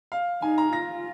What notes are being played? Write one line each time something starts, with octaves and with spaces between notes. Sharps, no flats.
F5
D#4 G#5
A#5
F4 A#6